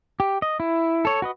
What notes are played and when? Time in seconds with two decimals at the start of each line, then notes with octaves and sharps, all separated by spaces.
0.20 G4
0.42 D#5
0.60 E4
1.05 A4 C#5
1.22 F#4 B4 D#5